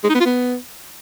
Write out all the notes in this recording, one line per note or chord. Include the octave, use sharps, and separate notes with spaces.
G#3
D#4
B3
F4
B3